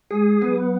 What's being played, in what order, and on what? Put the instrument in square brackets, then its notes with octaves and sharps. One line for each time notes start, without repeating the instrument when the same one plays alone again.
[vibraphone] G#3 [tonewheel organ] G#4
[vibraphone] F#3 [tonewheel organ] B3